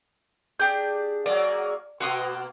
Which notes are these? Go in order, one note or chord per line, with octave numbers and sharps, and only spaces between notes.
D4 G4 G#4 G6
F#3 G#3 A#3 D5
B2 A#3 F#4 C6 D#6